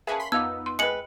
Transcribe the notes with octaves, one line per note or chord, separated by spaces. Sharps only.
A#3 C#4 G#4 B4 E5 G#5 A5
B5 C6 B6
F2 B3 D#4 F5 D6 E6
C6
G#3 C4 B4 C#7 F#7